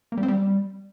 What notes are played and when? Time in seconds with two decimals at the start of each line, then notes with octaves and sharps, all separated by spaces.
0.12 A#3
0.17 G3
0.23 C4
0.28 G3